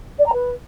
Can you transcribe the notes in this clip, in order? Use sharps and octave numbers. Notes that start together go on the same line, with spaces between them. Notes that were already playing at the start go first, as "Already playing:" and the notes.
D5
A#5
B4